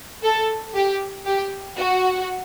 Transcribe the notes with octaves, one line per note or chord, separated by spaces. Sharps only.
A4
G4
G4
F#4